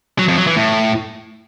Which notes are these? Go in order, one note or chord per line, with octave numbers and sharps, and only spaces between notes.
F#3
F2
F#3
E3
A2